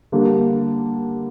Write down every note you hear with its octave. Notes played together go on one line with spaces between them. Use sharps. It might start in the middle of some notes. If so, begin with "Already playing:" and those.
D3 G3 A#3